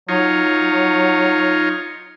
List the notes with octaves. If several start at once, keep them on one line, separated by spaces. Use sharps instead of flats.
F#3 D#4 F4 C#5